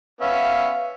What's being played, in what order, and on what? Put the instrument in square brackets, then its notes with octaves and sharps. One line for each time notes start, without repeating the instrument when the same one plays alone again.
[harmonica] B3 C#4 E5 [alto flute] F5